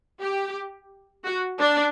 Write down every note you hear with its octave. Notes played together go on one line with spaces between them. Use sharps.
G4
F#4
D4